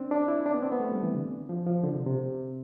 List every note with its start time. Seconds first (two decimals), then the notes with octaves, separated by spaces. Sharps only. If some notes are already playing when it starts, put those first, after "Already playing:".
Already playing: C4 D4
0.11 D4
0.28 E4
0.46 D4
0.54 B3
0.63 C4
0.72 B3
0.80 A3
0.92 G3
1.03 E3
1.15 D3
1.49 F3
1.66 F3
1.83 D3
1.96 C3
2.07 C3